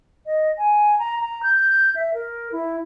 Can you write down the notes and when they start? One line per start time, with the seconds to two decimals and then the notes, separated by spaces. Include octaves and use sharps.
0.26 D#5
0.58 G#5
0.99 A#5
1.20 A#5
1.43 G6
1.95 E5
2.14 A#4
2.52 E4